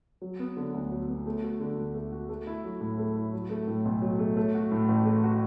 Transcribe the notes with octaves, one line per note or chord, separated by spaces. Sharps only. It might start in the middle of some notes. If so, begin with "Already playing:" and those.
F#3
B3
D3
D2
F#3
B3
A3
F#4
D3
D2
A3
F#4
A3
E4
F#3
A2
A3
E4
F#3
A3
A2
B1
F#3
A3
A3
F#4
A2
A1
A3
F#4